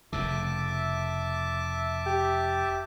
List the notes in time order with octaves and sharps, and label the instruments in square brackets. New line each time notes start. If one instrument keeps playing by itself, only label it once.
[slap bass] F1 F2 C#3 [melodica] E5 A5 D6
[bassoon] G4